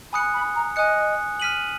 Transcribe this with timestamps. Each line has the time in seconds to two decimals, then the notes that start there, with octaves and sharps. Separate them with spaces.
0.13 G#5 B5 D#6 F#6 C#7
0.34 B5
0.55 A#5
0.76 D#5 G#5 D#6 F#6 C#7
1.40 F6 B6 D#7 F#7